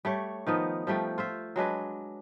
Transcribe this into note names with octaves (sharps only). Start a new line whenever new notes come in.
G3 A3 C#5
D#3 F3 B3 D#4
F3 G3 A3 G5
F4 C5 E5
F#3 G#3 D4 B4